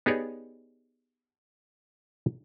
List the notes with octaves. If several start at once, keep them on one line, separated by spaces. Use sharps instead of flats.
B3 D#4 G4 G#4 C#5 D5